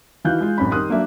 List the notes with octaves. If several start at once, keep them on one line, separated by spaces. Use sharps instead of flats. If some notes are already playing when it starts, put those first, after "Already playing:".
D#3 E3 F#4 F5 F#6 G6
G#3 F4
A1 F#2 C4 C#4 D#4 B5
D#3 G3 A#4 C6 D#6 F#6
F#3 A#3 D4 E5